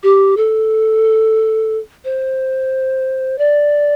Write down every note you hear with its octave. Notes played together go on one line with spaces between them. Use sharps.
G4
A4
C5
D5